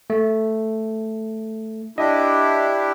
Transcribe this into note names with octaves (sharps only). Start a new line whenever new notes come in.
A3
D4 E4 G4 D#5